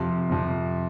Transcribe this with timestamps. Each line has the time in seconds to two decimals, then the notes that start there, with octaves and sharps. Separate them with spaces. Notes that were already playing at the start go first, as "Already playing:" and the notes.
Already playing: F2 C3 F3
0.29 F2 C3 F3